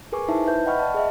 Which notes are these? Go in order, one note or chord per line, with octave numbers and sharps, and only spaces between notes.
G#4 A#4 B4 G#5 C#6 D6
D#4 E4 C5 E5 A5
B4 E5 G6
D#5 F#5 G5 B5 C#6 F6
D5 A5
G#4 D#5 E5